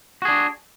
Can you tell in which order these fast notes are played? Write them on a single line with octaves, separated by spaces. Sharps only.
F#4 G#4 D4